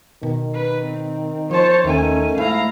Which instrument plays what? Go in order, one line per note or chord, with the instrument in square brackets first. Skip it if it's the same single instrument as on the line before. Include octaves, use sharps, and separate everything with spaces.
[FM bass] B2 [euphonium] D#3
[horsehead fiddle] B4
C4
[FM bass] F3 [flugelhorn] C5 [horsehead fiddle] C#5 A5
[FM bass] D#2 [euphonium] D#3 [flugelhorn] A3 [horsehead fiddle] C#4 G#5
[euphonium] G#2 [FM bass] A3 [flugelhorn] E4 [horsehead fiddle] F5 A#5